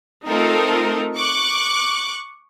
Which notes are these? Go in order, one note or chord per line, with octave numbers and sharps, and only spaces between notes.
A3 C4 D#4 F4 A4 A#4
C#6 D6 F#6